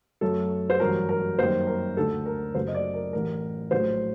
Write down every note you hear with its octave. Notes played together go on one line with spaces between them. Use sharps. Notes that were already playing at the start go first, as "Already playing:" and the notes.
F#2 F#3 A3 A4
C5
A1 G2 F#3 A#4
A#4
F#2 D#3 G3 A#3 C5
A#4
D2 D3 A3 A4
A#4
F#1 F#2 F#3 A3 C5
D#5
D5
A#4
A1 A2 A3 A#4
A#1 A2 F#3 A3 C5